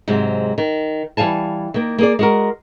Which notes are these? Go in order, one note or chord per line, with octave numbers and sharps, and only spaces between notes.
G#2 C3 F#3 G#3
D#3
E3 G3 F5 G#5 A5
D#3 A#3
A#3 G#4 D5
G#3 F#4 A#4